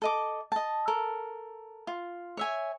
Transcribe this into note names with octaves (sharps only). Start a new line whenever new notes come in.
A4 D#5 D6
D#5 A5
A4 A#4
F4
C#5 E5 G#5